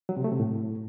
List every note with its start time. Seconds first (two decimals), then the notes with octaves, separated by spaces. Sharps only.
0.09 F#3
0.17 C3
0.24 A3
0.32 C3
0.40 A2